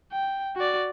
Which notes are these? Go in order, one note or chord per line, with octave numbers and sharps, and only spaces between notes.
G5
F#4 D5